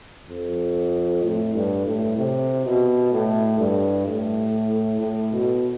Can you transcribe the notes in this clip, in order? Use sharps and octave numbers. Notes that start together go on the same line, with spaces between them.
F2
A2
G2
A2
C3
B2
A2
G2
A2
A2
B2